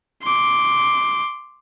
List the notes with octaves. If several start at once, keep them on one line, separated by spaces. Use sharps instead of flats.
C6 D6